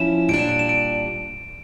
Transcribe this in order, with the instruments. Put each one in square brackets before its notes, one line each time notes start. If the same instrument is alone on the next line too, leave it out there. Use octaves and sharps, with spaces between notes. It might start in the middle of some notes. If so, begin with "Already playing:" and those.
Already playing: [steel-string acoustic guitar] F3 C#4 E4 [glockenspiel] E7
[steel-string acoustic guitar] A#2 G3 D4 [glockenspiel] D7
[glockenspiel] E7
D7
E7
D7